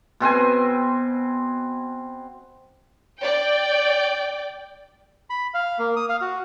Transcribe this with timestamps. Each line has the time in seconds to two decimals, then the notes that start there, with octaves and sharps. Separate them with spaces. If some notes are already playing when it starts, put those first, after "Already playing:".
0.20 B2 C4 C5 G#5
3.19 D5 G5
5.30 B5
5.54 F5
5.79 A#3
5.96 D#6
6.09 F5
6.21 F#4